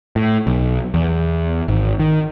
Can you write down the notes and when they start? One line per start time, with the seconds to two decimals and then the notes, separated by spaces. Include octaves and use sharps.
0.16 A2
0.47 B1
0.94 E2
1.68 G#1
1.99 D#3